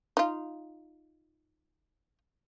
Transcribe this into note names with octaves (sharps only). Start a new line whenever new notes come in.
D#4 F4